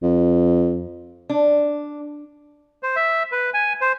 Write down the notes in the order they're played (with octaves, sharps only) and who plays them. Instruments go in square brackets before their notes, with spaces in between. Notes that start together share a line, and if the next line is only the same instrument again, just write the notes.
[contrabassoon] F2
[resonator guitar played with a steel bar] D4
[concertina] C5
E5
B4
G#5
C5